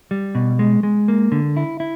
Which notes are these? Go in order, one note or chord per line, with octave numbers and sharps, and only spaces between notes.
G3
B2
G#3
G#3
A#3
D3
E4
E4